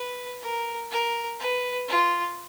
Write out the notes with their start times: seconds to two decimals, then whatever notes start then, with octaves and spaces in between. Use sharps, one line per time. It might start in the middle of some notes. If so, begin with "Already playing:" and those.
Already playing: B4
0.42 A#4
0.91 A#4
1.39 B4
1.88 F4